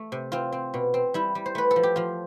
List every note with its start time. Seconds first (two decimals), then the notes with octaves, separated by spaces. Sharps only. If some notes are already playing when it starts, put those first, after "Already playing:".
Already playing: A3
0.12 C3
0.32 C4 F4
0.52 C4
0.74 B2
0.94 C4
1.14 G3 E4
1.35 G3
1.46 C5
1.55 A3 B4
1.71 A4
1.76 F3
1.83 G4
1.96 F3 F4